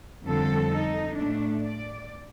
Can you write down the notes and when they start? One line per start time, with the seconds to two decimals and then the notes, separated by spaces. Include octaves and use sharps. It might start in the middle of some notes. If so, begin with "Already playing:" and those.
0.25 F2 D3 G3 C4 A4
0.71 D#4
1.16 A2 A3 D4
1.60 D5